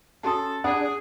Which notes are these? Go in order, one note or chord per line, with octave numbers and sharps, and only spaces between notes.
C#4 F#4 A4 A5 C6 D#6
G2 D4 G#4 F#5 D#6